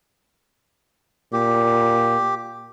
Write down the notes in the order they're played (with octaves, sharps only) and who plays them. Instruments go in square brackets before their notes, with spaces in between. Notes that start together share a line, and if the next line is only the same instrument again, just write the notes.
[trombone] A#2 [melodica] G4